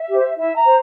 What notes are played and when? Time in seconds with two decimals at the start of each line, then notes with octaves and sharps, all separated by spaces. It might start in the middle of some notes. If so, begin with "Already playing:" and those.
Already playing: E5
0.09 G4 C5
0.37 E4 E5
0.55 A#5
0.64 C5